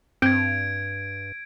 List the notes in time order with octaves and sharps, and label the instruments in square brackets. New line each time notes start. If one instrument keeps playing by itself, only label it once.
[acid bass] G2 [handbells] C4 G6 [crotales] G#6 D7